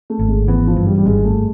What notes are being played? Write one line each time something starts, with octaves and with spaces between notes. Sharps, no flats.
A3
G#1
G#3
E3 B3
F3
G2
G3
G3
G#1 G#3
A3